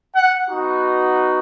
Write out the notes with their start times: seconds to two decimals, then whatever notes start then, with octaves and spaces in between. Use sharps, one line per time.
0.15 F#5
0.49 B3 D#4 F#4